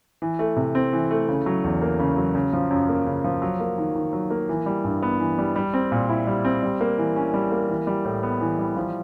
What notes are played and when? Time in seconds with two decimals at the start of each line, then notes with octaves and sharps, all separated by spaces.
0.22 E3
0.39 A3
0.56 C3
0.75 C4
0.93 E3
1.11 A3
1.28 C#3
1.46 F#3
1.64 E2
1.82 A#3
1.99 C#3
2.17 F#3
2.35 C#3
2.53 F3
2.71 F#2
2.89 A#3
3.06 C#3
3.24 F3
3.42 F#3
3.60 A#3
3.78 D#3
3.95 D#3
4.13 F#3
4.31 A#3
4.49 E3
4.66 G3
4.84 G2
5.02 B3
5.20 E3
5.38 G3
5.56 G3
5.74 C4
5.92 A#2
6.09 E4
6.27 G3
6.45 C4
6.63 G3
6.81 A#3
6.98 E3
7.16 C#4
7.34 G3
7.52 A#3
7.69 E3
7.87 G3
8.05 A2
8.23 B3
8.41 E3
8.59 G3
8.76 F3